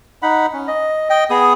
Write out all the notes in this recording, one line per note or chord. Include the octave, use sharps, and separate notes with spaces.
D#4 F#5 B5
C#4
D#5
D#5 G5
B3 G#4 D#6